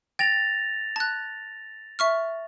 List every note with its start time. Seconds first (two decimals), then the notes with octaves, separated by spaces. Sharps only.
0.19 G5 A6 A#6 F7
0.96 A5 F#6
1.99 E5 C#6 F6